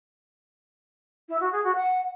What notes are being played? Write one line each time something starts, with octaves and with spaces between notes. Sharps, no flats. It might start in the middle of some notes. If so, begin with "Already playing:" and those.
E4
F#4
G#4
F#4
F#5